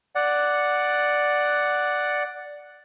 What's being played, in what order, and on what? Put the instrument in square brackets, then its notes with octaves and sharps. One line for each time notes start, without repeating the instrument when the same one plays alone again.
[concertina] D5 F#5